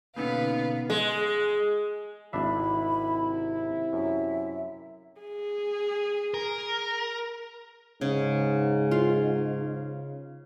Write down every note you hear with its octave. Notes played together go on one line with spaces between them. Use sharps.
B2 D3 A#3 B3 C#4 D#4 B4 F5
G#3
G#1 C3 D4 E4 E5 B5
F#2 E5
G#4
A#4
G#2 C#3
F4